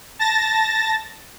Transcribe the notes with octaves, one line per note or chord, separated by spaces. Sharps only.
A5 A6 A#6